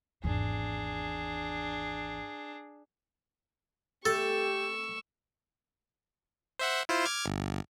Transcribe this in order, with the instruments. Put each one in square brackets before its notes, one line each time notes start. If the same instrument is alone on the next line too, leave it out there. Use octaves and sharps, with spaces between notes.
[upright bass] G#1 E2 [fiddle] D4 G#4
[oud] A3 [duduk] G4 [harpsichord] A4 [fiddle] C#6 E6
[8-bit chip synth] C5 E5 F#5
E4 F4 C5
D6 F6 G#6
G1